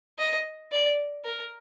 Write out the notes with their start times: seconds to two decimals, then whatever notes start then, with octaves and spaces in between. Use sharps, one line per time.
0.19 D#5
0.72 D5
1.25 A#4